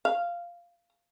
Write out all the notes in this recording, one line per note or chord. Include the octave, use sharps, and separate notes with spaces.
F5